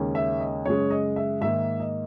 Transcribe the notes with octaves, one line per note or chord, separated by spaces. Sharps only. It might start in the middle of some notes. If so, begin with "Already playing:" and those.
Already playing: D#2 C#3 G#3 C#4
E5
D#5
F#2 C#3 G#3 C#5
D#5
E5
G#2 D#3 A#3 E5
D#5